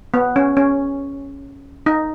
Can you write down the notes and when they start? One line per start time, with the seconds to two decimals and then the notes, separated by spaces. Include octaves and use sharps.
0.14 B3
0.36 C#4
0.57 C#4
1.86 D#4